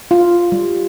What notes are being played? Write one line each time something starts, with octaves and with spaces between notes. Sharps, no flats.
F4
G3